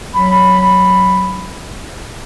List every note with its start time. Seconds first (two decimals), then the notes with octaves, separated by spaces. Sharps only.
0.13 F#3 B5